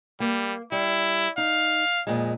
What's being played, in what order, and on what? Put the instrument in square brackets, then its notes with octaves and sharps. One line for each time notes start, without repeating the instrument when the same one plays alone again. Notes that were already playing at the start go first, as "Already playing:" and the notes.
[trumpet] G3 [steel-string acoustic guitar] A#3
[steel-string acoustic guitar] G3 [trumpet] E4
[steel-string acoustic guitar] D#4 [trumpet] F5
[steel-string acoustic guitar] F2 A#2 G#3